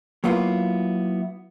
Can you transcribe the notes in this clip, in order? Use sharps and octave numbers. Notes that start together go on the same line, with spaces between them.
F#3 A#3 B3 E4 F4